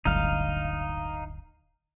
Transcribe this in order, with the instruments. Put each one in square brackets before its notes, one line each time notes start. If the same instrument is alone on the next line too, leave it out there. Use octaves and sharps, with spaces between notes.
[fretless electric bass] D1 G1 D3 [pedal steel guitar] D#4 F5